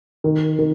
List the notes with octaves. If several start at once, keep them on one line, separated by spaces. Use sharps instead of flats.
D#3
D#3